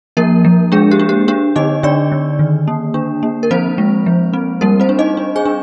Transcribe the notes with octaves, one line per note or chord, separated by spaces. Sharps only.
F3 A#3 A#4
F3
G#3 D4 G#4
G4
D4
G4
D4 G4
D3 D#4 D#5
D3 D4 D5
D3
D#3
A#3
D4
A#3
A#4
F3 C4 C5
G#3
F3
C4
G3 A#3 A#4
C4 C5
D4
D#4 D#5
D4
G#4 G#5
D4